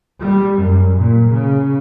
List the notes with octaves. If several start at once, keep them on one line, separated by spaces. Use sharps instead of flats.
G3
F#2
A#2
C#3